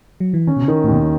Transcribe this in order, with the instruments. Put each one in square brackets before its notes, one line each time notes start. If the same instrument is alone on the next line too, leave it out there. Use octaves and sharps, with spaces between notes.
[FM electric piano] F#3
E3
[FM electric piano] D#3 [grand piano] C#4
[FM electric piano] B2
C#3
[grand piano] D#3
[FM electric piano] A2
[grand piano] D#2 [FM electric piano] B2